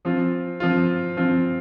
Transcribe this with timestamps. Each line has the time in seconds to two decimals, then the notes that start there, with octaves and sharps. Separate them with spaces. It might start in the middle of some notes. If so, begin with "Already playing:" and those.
0.05 F3 C4 F4
0.60 F3 C4 F4
1.17 F3 C4 F4